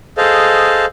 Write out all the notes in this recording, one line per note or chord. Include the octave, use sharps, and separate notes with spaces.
G#4 A4 C5 D#5 F5